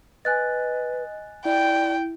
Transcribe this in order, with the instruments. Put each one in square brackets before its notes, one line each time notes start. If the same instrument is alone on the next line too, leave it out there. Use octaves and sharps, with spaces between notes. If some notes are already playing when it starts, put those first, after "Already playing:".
[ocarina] B4 [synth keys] D#5 [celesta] G#5 F#6 A6
[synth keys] E4 [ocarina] D5 [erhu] G5